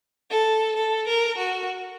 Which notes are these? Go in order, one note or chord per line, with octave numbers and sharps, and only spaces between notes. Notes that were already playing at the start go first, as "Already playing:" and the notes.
A4
A4
A#4
F#4